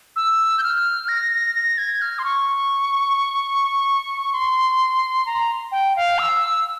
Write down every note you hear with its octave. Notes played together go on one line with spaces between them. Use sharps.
E6
G6
F6
A#6
A#6
G#6
F6
C6
C#6
C6
A#5
G5
F5
E6